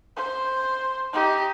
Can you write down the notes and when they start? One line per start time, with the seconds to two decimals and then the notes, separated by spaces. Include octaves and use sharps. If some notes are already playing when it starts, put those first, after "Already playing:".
0.17 C5
1.13 D#4 G4